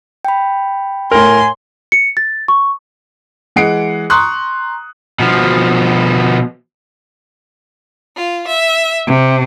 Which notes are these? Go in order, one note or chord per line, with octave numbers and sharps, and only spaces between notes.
G5 B5
A2 A#4 G#5 C6
C#7
A6
C#6
E3 G#3 D#5 F#5 C7 D7
A#5 C6 C#6 D#6 F#6
B2 F3
F4
E5
C3